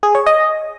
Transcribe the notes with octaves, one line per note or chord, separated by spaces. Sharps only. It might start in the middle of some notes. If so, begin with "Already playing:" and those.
G#4
C#5
D#5